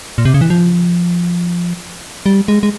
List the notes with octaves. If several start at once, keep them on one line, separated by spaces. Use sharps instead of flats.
A#2
C3
C#3
E3
F3
G3
G#3
G#3